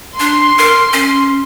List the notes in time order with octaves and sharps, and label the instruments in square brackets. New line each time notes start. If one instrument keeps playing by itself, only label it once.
[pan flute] D4 [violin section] C6
[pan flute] A#4
C#4